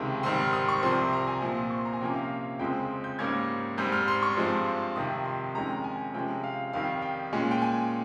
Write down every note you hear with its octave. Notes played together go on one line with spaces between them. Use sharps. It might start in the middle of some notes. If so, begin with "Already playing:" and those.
Already playing: C#2 C3 D#3 G#3 G5
G#2 D#3 G3 C4 C6
F6
D#6
C#6
C2 C3 F3 C4 C6
A#5
G#5
A#2 F3 C4
C#6
C6
A#5
G#5
C3 F3 A#3 C#4 G5
F5
F2 C#3 F3 G#3 C4 G5
G6
G#2 G3 A#3 C#4 G#6
G#2 G3 C4 G6
F6
C6
C#6
G2 F3 G#3 C4
F2 C3 D#3 D#6
C6
F2 D#3 G#3 C#4 A#5
G#5
C3 F3 G#3 C#4 G5
F5
F2 D#3 G3 F5
G5
A#2 G#3 C#4
G5
G#5